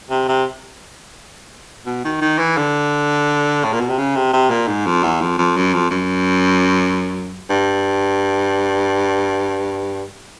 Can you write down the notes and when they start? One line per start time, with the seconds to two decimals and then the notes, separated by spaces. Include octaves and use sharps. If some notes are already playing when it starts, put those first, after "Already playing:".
0.10 C3
0.28 C3
1.86 B2
2.05 D#3
2.21 D#3
2.39 E3
2.57 D3
3.64 A2
3.73 A#2
3.80 B2
3.89 C3
3.98 C#3
4.16 C3
4.33 C3
4.50 A#2
4.67 G#2
4.86 F2
5.03 E2
5.21 F2
5.38 F2
5.56 F#2
5.74 F2
5.91 F#2
7.50 G2